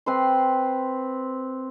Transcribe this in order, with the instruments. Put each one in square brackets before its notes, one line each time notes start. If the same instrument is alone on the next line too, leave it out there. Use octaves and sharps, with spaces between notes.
[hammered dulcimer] C4 B4 C6